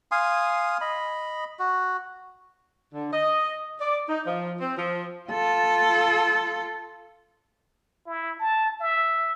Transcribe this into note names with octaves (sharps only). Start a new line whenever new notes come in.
F5 G#5 C6 D#6
D#5 B5
F#4
D3
D#5
D5
D#4
F3
C4
F3
F4 A4
E4
A5
E5